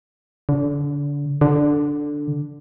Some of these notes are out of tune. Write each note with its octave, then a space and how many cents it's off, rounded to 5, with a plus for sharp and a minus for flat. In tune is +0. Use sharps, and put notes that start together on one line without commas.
D3 -30
D3 +0